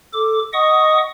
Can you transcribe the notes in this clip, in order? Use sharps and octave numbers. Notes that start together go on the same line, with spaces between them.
A4 D6
D#5 F#5 C#6 D#6